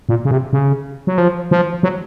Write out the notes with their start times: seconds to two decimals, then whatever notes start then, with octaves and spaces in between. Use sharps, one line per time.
0.09 A#2
0.25 C#3
0.31 C3
0.53 C#3
1.07 F#3
1.18 F3
1.51 F3
1.83 F#3